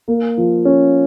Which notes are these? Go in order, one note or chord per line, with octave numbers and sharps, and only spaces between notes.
A#3
F3
C#4